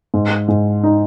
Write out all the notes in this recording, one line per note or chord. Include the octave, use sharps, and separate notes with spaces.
G#2
G#2
D#4